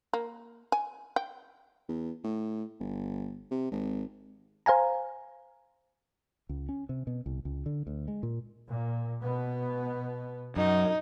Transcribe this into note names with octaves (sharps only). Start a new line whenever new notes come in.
A#3
G#5
G5
E2
A2
G1
C3
G#1
C5 F5 G#5 A#5
C#2
C#4
C3
B2
C2
C#2
D3
D2
G#3
A#2
A#2
B2 B3
F#2 D#4